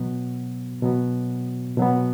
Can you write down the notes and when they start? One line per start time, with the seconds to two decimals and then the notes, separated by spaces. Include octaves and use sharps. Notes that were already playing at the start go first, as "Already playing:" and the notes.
Already playing: B2 F#3 B3
0.83 B2 F#3 B3
1.77 B2 F#3 B3